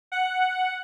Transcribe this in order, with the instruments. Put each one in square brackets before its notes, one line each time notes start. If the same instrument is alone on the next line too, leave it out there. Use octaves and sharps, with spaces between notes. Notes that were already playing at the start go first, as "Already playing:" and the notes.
[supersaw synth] F#5